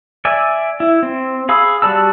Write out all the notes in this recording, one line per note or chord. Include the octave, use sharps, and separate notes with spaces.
D5 E5 G#5
E4
C4
G#4 F5 B5 D#6 E6
G3 F#4 D5 A5 E6